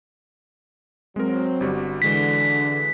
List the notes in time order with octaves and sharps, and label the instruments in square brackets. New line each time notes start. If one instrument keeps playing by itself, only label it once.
[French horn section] F#3 C4 [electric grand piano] G#3 A#4
[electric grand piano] G1 G3 F#4
[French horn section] D3 [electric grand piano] E3 G#3 F#4 [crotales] B6